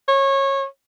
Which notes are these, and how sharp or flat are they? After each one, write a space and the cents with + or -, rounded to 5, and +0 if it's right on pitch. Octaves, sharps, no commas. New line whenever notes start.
C#5 -20